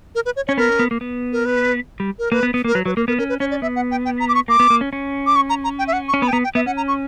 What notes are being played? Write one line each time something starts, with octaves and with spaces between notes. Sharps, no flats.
A#4
B4
C#5
C#4 C#5
B3 A#4
C#4
B3
A#3
B3
A#4
B4
G3
A#4
A#3 B4
B3
B3
A#3 A#4
F#3 B4
F#3 B4
A#3 A#4
B3 A#4
C#4 A#4
B4
C#4 C#5
D5
B3 E5
F#5
G5
G5
A#5
D6
C#6
A#3 D6
B3
A#3
C#4
C#4
D6
C#6
A#5
A#5
G5
E5
F#5
C#6
C#4
B3 B5
G5
B3 A#5
G5
B3 E5
C#4 F#5
A#5
C#6